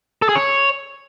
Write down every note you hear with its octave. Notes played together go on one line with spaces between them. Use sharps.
A4
G#4
C#5